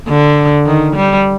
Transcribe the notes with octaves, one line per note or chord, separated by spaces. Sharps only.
D3
D#3
G3